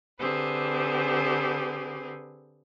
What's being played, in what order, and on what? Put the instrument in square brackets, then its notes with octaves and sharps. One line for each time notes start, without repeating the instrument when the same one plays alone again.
[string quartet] D3 C4 G4 G#4 B4